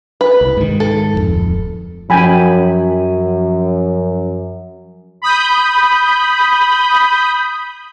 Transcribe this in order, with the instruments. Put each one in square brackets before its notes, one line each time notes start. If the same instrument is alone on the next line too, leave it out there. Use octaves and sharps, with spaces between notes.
[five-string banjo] B4
[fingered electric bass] C2
G#2 D#3
[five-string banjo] A4
[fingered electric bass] D1 G1 F2
[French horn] F#2 [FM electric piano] F3 C#4 [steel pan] G5 G#5 B5
[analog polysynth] B5 D#6 G6